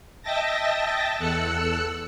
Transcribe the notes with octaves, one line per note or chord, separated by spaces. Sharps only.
D#5 E5 G5 A5 A6 A#6
E2 A4 E6 F#6 C#7